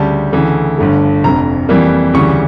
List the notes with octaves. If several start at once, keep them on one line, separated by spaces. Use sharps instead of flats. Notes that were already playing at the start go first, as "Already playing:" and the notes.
Already playing: D2 C#3 G3 A5
D2 C#3 E3 A3
G1 G2 D3 A3
F1 F2 D3 A#5
F2 E3 G3 A#3
D2 C#3 E3 G3 C#6